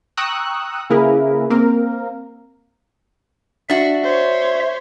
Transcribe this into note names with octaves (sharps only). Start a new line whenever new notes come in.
G5 A#5 C#6 D#6 E6 F#6
C#3 A#3 E4 G#4 A#4 B4
A#3 C4 A#4
D4 F#4 E5
C5 C#5